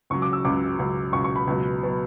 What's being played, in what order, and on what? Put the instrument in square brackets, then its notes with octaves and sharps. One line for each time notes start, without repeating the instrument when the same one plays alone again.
[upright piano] C#2 C#3 F#3 C#6
D6
E6
C#2 C#3 F#3 D6
C#2 C#3 F#3
C#2 C#3 F#3 C#6
C#6
B5
C#2 B2 F#3
B2 F#3